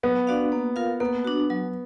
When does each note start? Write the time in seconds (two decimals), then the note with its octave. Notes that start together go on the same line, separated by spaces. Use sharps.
0.03 F#3 B3
0.27 D4 F#4 D5 F5
0.52 A#3
0.76 F4 A#4 F5
1.00 A#3 B3
1.25 D4 F#4
1.50 F#3